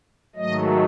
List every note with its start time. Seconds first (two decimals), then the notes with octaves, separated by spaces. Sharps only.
0.36 G#2 D#3 F#3 A3 D#5